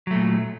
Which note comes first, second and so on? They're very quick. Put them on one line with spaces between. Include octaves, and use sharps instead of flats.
F#3 A3 A#2